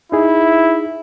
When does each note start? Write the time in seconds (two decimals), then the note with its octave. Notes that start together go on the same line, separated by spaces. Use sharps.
0.12 D#4 E4 G#4